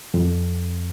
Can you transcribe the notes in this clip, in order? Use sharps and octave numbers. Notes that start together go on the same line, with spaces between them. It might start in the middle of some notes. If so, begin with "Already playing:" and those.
F2